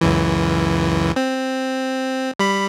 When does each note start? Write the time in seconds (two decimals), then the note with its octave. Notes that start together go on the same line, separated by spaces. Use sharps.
0.01 C#2 F#2 E3
1.16 C4
2.39 G3 B5